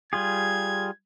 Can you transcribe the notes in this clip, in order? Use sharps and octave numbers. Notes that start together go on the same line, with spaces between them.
G3 F4 G#4 G#6